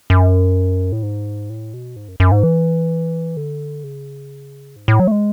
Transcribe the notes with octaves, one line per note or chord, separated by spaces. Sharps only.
F#2
A2
G#2
A2
B2
G#2
F#2
F#2
G#2
E3
D3
C#3
G#2
A2
F#3
A3
G#3